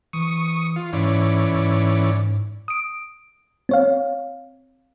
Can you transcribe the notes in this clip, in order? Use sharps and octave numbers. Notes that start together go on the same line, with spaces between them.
E3 C#6 D#6
F4
G#2 E3 C#4 D5
G#2
D#6 D7
C4 C#5 F5